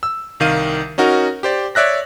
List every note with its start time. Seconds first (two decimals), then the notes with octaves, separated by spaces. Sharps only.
0.03 E6
0.40 C2 D#3 F5 D#7
0.98 C#4 D#4 F#4 A#4
1.43 G4 C5 D5
1.75 C#5 D5 E5 F#6 A#6